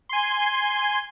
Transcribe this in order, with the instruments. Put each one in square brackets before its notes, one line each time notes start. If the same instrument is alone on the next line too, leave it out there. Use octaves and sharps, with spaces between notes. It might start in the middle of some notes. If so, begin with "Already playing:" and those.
[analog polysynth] G#5 C6